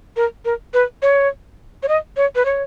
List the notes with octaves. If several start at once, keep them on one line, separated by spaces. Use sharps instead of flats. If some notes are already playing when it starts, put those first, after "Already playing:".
A#4
A#4
B4
C#5
C#5
D#5
C#5
B4
C#5